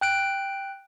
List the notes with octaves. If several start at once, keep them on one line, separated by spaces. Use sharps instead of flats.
G5 F#6 D7